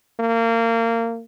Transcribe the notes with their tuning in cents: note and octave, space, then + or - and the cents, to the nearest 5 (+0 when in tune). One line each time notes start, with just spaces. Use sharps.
A#3 -25